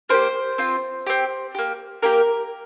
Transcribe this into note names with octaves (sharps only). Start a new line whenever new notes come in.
A#3 G4 C5
C4 F4
C4 G4
A#3 G4
A#3 G4 A#4